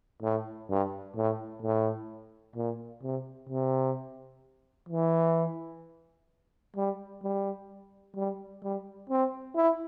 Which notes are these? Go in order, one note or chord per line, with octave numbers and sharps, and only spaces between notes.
A2
G2
A2
A2
A#2
C3
C3
E3
G3
G3
G3
G3
C4
E4